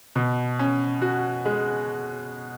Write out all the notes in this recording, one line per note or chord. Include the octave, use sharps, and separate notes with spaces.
B2
C#4
F#4
G#3